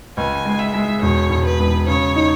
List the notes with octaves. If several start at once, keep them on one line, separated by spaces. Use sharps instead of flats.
C#2 G#5
G#3
E5
G#3
E1 C#5
E1
B4
E1
C#3 C#5
D#4